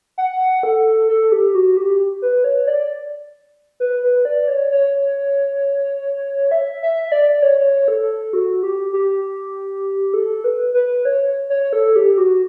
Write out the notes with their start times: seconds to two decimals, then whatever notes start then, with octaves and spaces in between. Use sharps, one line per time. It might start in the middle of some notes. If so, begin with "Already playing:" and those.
0.18 F#5
0.63 A4
1.09 A4
1.32 G4
1.55 F#4
1.77 G4
2.22 B4
2.44 C#5
2.67 D5
3.80 B4
4.03 B4
4.25 D5
4.48 C#5
4.71 C#5
6.51 E5
6.83 E5
7.08 E5
7.12 D5
7.42 C#5
7.88 A4
8.33 F#4
8.63 G4
8.93 G4
10.14 A4
10.44 B4
10.74 B4
11.05 C#5
11.50 C#5
11.73 A4
11.96 G4
12.18 F#4